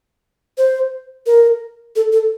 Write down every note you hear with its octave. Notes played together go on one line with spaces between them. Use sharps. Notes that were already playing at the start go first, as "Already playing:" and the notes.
C5
A#4
A4
A4